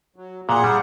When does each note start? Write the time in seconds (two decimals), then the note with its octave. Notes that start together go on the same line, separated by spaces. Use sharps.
0.16 F#3
0.49 A#2 G#4 F#5
0.64 G3